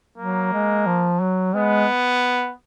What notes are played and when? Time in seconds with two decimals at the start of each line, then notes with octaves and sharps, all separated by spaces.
0.18 F#3 A#3
0.53 G#3
0.87 F3
1.21 F#3
1.55 G#3 B3